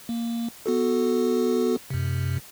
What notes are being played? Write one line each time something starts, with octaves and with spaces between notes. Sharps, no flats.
A#3
B3 F#4 A4
F#2 C3